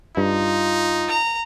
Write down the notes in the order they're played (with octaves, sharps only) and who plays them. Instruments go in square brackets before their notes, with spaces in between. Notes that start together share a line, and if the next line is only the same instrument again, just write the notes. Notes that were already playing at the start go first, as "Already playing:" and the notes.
[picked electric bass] G2 [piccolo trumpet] D#4 [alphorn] F4
[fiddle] A#5